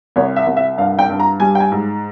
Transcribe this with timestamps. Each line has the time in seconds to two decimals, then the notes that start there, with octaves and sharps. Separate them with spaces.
0.16 C2 C#5
0.36 E5
0.47 C2
0.57 E5
0.78 G2 F5
0.99 G5
1.10 G2
1.20 A#5
1.40 G3 G#5
1.55 G5
1.60 G#5
1.72 G#2